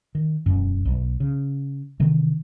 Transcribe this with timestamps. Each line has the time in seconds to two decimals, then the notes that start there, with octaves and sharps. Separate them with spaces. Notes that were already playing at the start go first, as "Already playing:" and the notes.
0.15 D#3
0.46 E1 F#2
0.85 B1
1.20 C#3
2.00 C3 D#3 E3